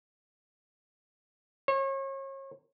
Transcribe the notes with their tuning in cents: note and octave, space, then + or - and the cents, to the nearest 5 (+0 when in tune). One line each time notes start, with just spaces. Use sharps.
C#5 -35